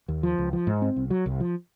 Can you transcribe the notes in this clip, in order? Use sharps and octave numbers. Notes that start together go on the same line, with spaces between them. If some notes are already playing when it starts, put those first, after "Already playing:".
D#2
F3
C#2
F3
G#2
C4
C2
F#3
C2
F3